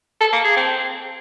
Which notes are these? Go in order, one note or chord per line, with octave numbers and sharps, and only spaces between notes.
A4
A#3
G#4
C4